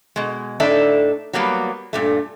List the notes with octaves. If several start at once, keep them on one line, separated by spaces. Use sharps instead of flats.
B2 G#3
A2 D4 D#4 A4 D5 E5
F#3 G3 A#3 B3
G2 A#2 A3